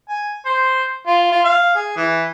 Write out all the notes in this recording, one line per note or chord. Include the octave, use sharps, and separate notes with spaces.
G#5
C5
F4
F4
F5
G#4
E3